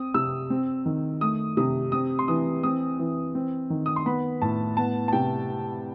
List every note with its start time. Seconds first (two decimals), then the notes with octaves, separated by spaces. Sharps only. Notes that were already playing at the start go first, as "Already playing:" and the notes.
Already playing: C4 D#6
0.14 C3 E6
0.50 C4
0.86 D#3
1.21 A3 D#6
1.57 C3 D#6
1.92 C4 D#6
2.19 C6
2.28 E3 D#6
2.63 C4 D#6
2.99 E3
3.35 C4
3.70 D#3
3.86 D#6
3.96 C6
4.06 B3 B5
4.42 A2 A5
4.77 B3 A5
5.08 A5
5.13 C3 G5